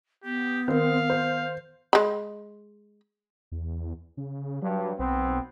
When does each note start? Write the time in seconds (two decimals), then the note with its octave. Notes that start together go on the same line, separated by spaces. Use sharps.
0.24 B3 G4
0.68 D#3 C4 A#4 F5
1.10 C5
1.93 G#3 B5
3.52 E2
4.17 C#3
4.62 G2 F#3
4.99 B1 B3 C4